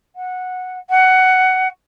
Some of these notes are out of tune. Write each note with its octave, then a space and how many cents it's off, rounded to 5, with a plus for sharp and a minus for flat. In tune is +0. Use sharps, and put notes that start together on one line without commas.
F#5 -10
F#5 +15